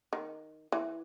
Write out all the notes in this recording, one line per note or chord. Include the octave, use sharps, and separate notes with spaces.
D#3
E3